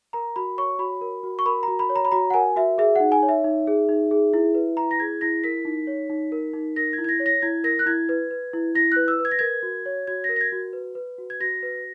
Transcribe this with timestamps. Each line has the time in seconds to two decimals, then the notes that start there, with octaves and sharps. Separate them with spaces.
0.13 A#4 A#5
0.36 F#4 B5
0.58 C#5 C#6
0.79 F#4 B5
1.01 A#4
1.23 F#4
1.39 C#6
1.46 A#4 B5
1.63 F#4 A#5
1.79 B5
1.89 C#5
1.96 A#5
2.05 B5
2.12 F#4 A#5
2.30 F#5
2.34 A#4 G#5
2.56 F#4 E5
2.78 G#4 E5
2.95 D#4 F#5
3.12 G#5
3.23 C#5
3.29 E5
3.44 D#4
3.67 G#4
3.89 D#4
4.11 G#4
4.34 E4
4.55 B4
4.77 E4 A#5
4.91 A#6
5.00 G#4 G#6
5.21 E4 A#6
5.44 A#4 B6
5.65 D#4
5.87 C#5
6.10 D#4
6.32 A#4
6.53 D#4
6.76 A#4 A#6
6.93 G#6
6.98 E4
7.04 G#6
7.09 A#6
7.20 C#5
7.26 A#6
7.42 E4 G#6
7.64 A#4 A#6
7.79 F#6
7.86 E4 G#6
8.09 B4
8.31 B4
8.53 E4
8.75 E4 A#6
8.92 B4 F#6
9.08 E6
9.20 B4
9.25 G#6
9.31 A#6
9.39 A#4 G#6
9.63 F#4
9.86 C#5
10.07 F#4 G#6
10.24 A#6
10.29 A#4
10.36 A#6
10.41 G#6
10.52 F#4
10.73 B4
10.95 B4
11.18 F#4
11.30 G#6
11.40 F#4 A#6
11.63 B4